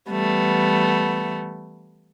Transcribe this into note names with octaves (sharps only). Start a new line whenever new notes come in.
E3 G3 A3 B3